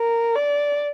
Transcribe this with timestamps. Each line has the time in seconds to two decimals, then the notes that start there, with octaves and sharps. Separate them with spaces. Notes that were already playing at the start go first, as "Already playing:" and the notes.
Already playing: A#4
0.35 D5